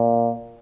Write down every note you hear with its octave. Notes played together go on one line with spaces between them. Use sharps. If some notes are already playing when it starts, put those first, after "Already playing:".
Already playing: A#2